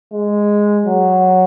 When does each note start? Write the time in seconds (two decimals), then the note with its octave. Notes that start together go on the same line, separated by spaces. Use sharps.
0.13 G#3
0.86 F#3